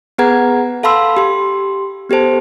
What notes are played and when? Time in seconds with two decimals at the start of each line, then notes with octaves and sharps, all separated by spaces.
0.18 B3 G#4 B4 F#5 A#5 G#6
0.83 A4 F5 A5 B5 C6 E6
1.17 G4 C6
2.10 B3 G4 A4 C5 A5